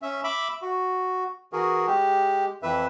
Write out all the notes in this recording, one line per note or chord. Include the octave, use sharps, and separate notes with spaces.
C#4 E5
E5 B5 D6
F#4
E3 F#4 G#4 A#4
G#3 G4
F2 E3 B4 E5